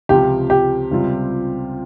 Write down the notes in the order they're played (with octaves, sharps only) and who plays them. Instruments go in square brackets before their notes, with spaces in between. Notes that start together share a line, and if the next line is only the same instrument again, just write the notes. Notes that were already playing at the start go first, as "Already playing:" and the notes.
[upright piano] C#2 C3 F3 [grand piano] G4
[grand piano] G4
[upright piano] C#2 C3 G3 C4 F4